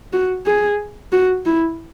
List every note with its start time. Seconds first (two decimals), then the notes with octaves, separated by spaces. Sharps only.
0.13 F#4
0.46 G#4
1.13 F#4
1.46 E4